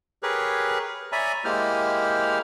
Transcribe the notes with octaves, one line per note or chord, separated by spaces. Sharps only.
G4 G#4 A#4 B4 C#5
C#5 D5 E5 G#5 A#5 B5
G#3 A#3 E4 G4 C5 F6